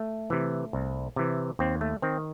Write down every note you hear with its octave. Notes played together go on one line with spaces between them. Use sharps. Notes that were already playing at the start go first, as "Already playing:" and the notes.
Already playing: A3
C3 E3
C2
C3 E3
D#2 C4
A3
D#3 C4